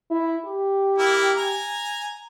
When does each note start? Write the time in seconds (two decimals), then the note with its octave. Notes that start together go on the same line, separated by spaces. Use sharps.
0.11 E4
0.46 G4
0.98 A#3 E4
1.37 G#5 A#5